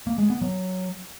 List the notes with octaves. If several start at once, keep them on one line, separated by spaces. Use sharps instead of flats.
A#3
G#3
B3
F#3